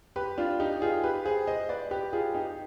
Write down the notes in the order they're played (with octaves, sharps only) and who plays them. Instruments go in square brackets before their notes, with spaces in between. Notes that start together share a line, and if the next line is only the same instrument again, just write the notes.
[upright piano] G4 B4
D4 F4
D#4 G4
F4 G#4
G4 B4
G#4 C5
C5 D#5
B4 D5
G4 B4
F4 G#4
D#4 G4